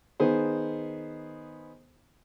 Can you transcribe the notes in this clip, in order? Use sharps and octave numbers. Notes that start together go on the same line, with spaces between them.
D#3 B3 G#4 C5